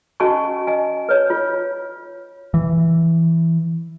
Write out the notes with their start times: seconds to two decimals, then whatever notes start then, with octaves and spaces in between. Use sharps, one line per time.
0.20 C#4 F#4 D#5 G#5 A5 C#6
0.67 D#5 G#5
1.09 B4 C#5
1.30 F4
2.54 E3